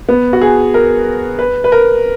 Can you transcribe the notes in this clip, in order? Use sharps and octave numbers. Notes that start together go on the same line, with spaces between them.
B3
F#4
G#4
A#4
B4
B4
A#4